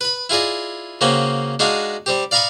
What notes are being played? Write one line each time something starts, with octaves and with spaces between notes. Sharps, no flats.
B4 B5
E4 F4 G#4 D5 D#5
C#3 A#3 C4 C#4 F#4
G#3 D4 D#4 F#4 F5
G3 C4 G4
D5 F5 A#5 B5 C#6 D#6